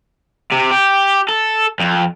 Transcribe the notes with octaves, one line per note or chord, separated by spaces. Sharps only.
C3
G4
A4
F2